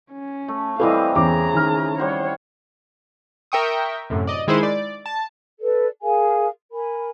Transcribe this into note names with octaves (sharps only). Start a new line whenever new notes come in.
C#4
A3
E3 G3 C4 E4 A4 D#5 F5
E2 C#3 G#4 A#5 D6
D#3 F6
G3 C5 C#5 F#5
A#4 E5 G5 C#6 D#6
F#2 A2 C3
D5 D#5
D#3 G#3 D#4 E4 C5 D#7
D5
A5
A4 B4 D5
G#4 A#4 F5 G#5
A#4 G#5 B5